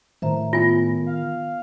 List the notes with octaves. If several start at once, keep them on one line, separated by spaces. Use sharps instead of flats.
A2 D#3 C5 E5 A#5
B3 F4 G#5
F5